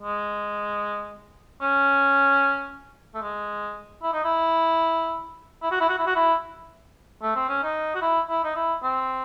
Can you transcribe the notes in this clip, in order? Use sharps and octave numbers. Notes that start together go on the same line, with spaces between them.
G#3
C#4
A3
G#3
E4
D#4
E4
E4
F#4
E4
F#4
E4
F#4
E4
A3
C4
C#4
D#4
F#4
E4
E4
D#4
E4
C4